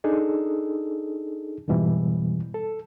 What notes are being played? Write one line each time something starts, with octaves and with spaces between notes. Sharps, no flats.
D4 D#4 G#4 A4
F2 G#2 B2 E3 G3
A4